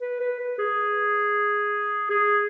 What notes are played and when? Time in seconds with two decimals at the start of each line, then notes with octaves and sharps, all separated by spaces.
0.01 B4
0.20 B4
0.39 B4
0.58 G#4
2.10 G#4